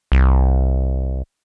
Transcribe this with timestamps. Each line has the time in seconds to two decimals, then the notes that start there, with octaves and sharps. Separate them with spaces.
0.12 C2